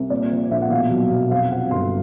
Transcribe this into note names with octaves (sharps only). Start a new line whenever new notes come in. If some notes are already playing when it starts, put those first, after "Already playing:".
Already playing: C2
A#2 D5
F3
A#1 E5
F#5
B2 F5
F#3
B1
F2 F5
C3 F#5
G1 C6